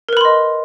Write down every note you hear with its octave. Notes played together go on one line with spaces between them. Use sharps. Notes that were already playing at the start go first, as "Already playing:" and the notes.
A#4 B4 D#5 B5 C6